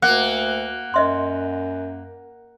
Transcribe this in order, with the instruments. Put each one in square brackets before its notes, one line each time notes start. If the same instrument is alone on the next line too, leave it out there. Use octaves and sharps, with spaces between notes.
[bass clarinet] D2 [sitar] A#3 [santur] F#5
[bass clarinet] F#2 [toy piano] D#5 E5 C6